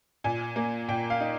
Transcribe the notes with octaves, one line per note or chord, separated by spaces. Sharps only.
A#2 G#5
A#3
A#2 G5
F5
D#4